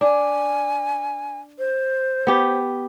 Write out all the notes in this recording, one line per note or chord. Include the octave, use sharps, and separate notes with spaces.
D4 G#5
C5
B3 G4